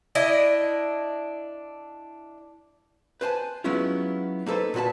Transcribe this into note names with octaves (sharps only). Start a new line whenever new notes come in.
D4 E4 D#5
B4 C5 G#5 A5
F#3 G#3 B3 C#4 E4 F4
A#3 D#4 A4 B4 C5
A#2 A#3 F#4 B4 A5